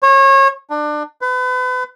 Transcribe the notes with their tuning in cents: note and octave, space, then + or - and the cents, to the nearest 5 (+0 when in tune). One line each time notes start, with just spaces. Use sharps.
C#5 -30
D4 +25
B4 +35